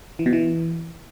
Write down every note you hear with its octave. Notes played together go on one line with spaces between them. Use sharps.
E3
B2
E3